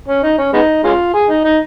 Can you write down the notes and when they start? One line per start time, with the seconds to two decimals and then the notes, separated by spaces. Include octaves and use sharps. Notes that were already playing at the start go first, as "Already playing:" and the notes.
0.08 C#4
0.23 D#4
0.38 C#4
0.53 G#3 B3 D#4
0.84 G#3 C#4 F4
1.14 G#4
1.29 D#4
1.44 D#4